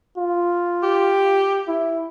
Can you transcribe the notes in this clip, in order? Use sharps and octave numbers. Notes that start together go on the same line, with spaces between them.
F4
G4
E4